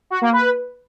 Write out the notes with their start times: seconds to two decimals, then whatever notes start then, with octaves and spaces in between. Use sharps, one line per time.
0.10 F#4
0.22 A#3
0.33 B4